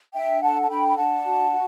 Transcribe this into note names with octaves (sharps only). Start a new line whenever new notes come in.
D4 E5 G5
A4 F#5 A5
A5
D4 G5 B5
B5
D4 F#5 A5
F#4
F#4